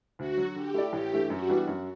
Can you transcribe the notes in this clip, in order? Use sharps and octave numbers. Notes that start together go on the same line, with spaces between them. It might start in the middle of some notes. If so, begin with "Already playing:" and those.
D2 F#4
D3 F#3
D3 G4
A3 E4 A4 D5
A1 G4
G2 E3 A3
F#2 F#4
E3 G3 B3 D4
F#2